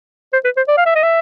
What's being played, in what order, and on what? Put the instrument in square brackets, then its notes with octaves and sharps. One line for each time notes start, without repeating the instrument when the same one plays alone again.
[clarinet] C5
B4
C5
D5
F5
E5
D#5
E5